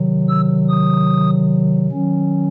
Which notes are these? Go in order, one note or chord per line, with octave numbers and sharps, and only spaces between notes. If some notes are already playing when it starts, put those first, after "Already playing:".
Already playing: C3 D#3 F#3
E6
D#6
D#3 F#3 C#4